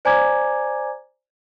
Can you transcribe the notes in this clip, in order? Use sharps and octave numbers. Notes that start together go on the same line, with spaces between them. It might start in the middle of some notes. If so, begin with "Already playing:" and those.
C5 D5 G#5 A#5 D6 G#6